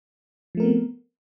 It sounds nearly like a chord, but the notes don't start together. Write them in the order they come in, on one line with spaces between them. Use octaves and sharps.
F3 A3 A#4 C4 B3